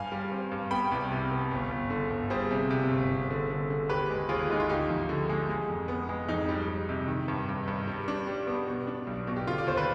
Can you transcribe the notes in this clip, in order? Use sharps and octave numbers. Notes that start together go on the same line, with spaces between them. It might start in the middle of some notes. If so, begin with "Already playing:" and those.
Already playing: G2 F5 G#5
G3
C4
G2
B3 G5 B5
C2
C3
B3
G1
G1
D3
G1
G3 G#4 C5
C3
C3
G1
G1
D3
D3
D3
D#2 G4 B4
G#3
D#2 F4 G#4
G#3 D#4
F4
D2 D#4 G4
F3
D3
G#3
G#3
F2
B3
G#3
F2 D#4
G3
G3
C3
D#3
G2
G2
G2
G3
D4
G3
B3
B2
D4
B1
B2
G4
D3 F4
D5
D#2 C5
B4